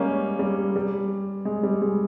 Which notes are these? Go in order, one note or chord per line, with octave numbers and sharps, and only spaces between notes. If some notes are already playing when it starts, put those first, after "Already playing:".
Already playing: G3 G#3 A#3 C#4
G3
G3
G#3
G3
G#3